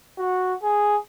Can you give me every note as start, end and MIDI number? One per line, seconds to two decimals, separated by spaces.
0.18 0.54 66
0.63 0.97 68